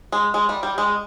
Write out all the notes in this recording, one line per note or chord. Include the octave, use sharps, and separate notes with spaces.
G#3
G#3
G3
G3
G#3